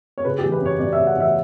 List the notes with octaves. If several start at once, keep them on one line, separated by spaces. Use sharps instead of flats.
C#5
C#3 B4
G4
E3
B4
F#2 C#5
F#2 D5
E5
C#3
F#5
E3 E5